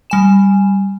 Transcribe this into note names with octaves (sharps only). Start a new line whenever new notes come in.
G3 G#5 E7